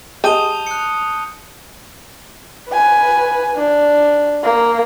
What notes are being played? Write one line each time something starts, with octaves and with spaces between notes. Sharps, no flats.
G#3 G4 A5 D#6 G6 D#7 G7
F#6 C#7
B4 G#5
D4
A#3